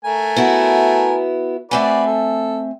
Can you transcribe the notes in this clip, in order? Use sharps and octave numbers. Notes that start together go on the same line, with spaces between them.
A3 A#4 G#5
B3 E4 F#4
A3 C4 F#4 B4 D5 G#5
A4